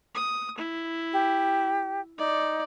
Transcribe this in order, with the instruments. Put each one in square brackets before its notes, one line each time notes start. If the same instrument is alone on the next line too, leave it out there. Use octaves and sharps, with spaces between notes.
[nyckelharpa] D#6
E4
[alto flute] G4
[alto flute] D#4 [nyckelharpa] D5